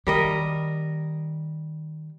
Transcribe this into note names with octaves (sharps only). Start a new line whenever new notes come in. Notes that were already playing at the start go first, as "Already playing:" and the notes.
D#3 G3 A#4 D#5